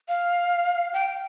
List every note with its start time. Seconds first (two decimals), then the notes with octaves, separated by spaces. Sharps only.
0.09 F5
0.93 G5